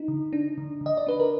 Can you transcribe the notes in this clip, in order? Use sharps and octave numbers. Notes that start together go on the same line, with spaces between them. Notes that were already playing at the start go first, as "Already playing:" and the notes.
Already playing: D#4
D3
D4
D3
D3
D#5
D5
D4 B4
A#4